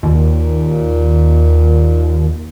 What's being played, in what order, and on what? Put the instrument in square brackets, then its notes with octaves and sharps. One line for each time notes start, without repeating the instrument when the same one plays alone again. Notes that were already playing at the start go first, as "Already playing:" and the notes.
[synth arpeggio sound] D#2 [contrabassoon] A#2